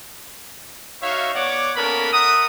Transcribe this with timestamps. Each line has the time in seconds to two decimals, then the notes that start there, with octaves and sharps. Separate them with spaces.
1.02 D#4 F#4 C#5 E5 F5
1.35 B3 C#5 D5 F#5 D6
1.76 A#3 B3 C#4 A4 A#4 B5
2.13 A#4 E5 F#5 D#6